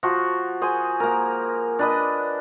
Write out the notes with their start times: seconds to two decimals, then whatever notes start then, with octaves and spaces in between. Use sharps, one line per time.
0.03 F3 F#4
0.62 G#4 C5 G#5
1.00 A#3 A#4
1.79 D4 B4 D#5